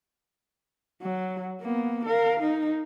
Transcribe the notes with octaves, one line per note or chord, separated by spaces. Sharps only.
F#3
A#3 B3
A#4 F5
D#4